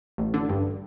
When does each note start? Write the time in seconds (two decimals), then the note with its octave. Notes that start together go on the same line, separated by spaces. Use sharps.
0.18 A1
0.34 D3
0.49 G2